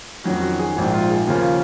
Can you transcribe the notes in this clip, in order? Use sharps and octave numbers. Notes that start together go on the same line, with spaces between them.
F2 D#3 F#3 C#4 F#4
F#4
G#4
A#1 G#2 F3 F#4
F4
G#4
D#2 C#3 F3 A#3 C#4 F4